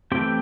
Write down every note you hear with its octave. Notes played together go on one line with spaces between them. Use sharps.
E3 A3 C4 G4 G5